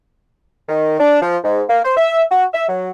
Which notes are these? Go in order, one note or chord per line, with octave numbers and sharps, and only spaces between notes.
D#3
D4
F3
G#2
A#3
C5
E5
F#4
E5
F#3